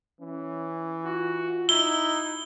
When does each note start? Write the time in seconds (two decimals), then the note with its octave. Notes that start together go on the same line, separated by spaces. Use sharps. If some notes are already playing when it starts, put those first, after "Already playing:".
0.20 E3 C#4
1.05 F4 F#4
1.69 D#4 E4 G7